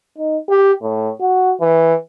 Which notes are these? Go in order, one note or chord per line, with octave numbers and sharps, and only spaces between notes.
D#4
G4
A2
F#4
E3